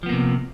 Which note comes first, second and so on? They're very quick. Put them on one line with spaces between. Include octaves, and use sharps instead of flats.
F3 B3 A#3 C3